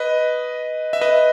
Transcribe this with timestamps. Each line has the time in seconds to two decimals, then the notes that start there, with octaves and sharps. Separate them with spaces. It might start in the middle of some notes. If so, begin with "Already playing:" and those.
Already playing: B4 D#5
0.93 E5
1.01 B4 D#5